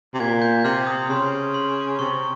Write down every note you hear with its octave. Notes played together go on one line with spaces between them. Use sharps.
C3
A#2 G#6
G6
C3 F6
D#6
C#3 C6
C6
C3 C#6